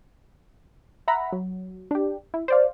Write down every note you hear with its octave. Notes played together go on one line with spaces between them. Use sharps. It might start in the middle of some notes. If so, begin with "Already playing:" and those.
E5 F#5 A#5 B5
F#3
D4 G4
E4
C5 D5 F5